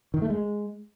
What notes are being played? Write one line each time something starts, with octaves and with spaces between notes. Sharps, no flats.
D#3
A3
G#3